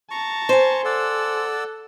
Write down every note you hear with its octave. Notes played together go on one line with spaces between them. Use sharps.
A5 A#5 C#6
C5 G#5
A4 D5 F#5 E6